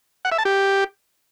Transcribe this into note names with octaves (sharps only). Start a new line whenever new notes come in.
F#5
E5
A5
G4